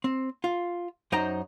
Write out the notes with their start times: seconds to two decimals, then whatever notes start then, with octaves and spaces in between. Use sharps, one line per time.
0.04 C4
0.44 F4
1.12 F#2 D#4 C5 D#5 G5 A#5